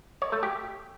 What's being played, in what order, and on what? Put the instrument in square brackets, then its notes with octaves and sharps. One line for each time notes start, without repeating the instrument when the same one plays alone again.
[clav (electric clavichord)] C#5
A3
G4